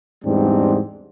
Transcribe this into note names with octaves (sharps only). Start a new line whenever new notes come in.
E2 G#2 G3 C4 D4